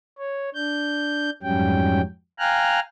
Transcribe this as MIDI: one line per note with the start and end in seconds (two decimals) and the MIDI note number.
0.19 0.50 73
0.54 1.30 62
0.54 1.30 91
1.43 2.01 41
1.43 2.01 44
1.43 2.01 54
1.43 2.01 55
1.43 2.01 61
1.43 2.01 79
2.39 2.80 77
2.39 2.80 79
2.39 2.80 80
2.39 2.80 82
2.39 2.80 89
2.39 2.80 90